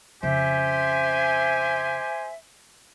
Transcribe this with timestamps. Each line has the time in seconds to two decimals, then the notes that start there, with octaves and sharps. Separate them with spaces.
0.23 F2 C#3 G4 C5 E5 G#5